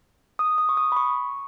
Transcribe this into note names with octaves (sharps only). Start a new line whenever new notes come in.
D#6
D#6
C#6
D#6
B5
C#6